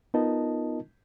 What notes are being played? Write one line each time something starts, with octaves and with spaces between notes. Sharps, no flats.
B3 D#4 F4 A#4 D#5 A5